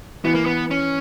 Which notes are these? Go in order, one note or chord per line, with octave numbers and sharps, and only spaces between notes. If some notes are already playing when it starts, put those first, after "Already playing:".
E3 B3
A#3
B3
C#4